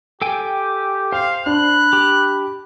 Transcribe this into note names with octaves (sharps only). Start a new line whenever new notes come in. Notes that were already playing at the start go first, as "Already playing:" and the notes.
G4 A4 G5 G#5
C5 F5 G5
D4 B5 F#6
G4